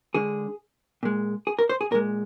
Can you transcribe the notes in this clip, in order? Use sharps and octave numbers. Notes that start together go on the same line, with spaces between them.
D3 G#3 G#4
A#2 G#3
G#4
A#4
C5
G#4
A#2 G#3 A#4